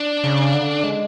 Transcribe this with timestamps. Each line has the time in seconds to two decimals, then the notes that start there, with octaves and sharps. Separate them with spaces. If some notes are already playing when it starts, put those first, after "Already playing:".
Already playing: D4
0.24 C#3
0.54 D3
0.84 G#3